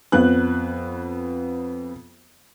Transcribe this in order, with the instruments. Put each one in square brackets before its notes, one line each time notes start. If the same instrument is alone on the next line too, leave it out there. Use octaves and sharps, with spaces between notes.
[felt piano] F2 B3 F#6